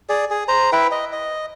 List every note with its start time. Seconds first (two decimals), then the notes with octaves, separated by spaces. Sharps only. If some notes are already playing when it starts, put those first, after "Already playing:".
0.09 G#4 D5
0.30 G#4
0.48 C5 A#5
0.72 E4 B4 E5 G5
0.91 D#5
1.12 D#5